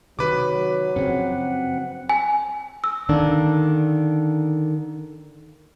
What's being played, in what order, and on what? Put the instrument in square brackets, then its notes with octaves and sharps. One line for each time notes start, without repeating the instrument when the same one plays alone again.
[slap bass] C3 D#3 [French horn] F#3 [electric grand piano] B4 D6
[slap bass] F#2 C#3 F3 [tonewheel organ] C4 F#5
[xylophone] G#5
E6
[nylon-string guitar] D3 D#3 A#3 D4